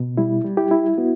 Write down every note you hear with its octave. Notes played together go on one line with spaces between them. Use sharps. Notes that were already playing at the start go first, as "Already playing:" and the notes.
Already playing: B2
G3 E4
G3
E4 G4
E4
B3 F#4